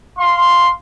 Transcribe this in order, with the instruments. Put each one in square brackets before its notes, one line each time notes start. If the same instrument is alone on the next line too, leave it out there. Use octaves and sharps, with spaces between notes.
[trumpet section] F5 C6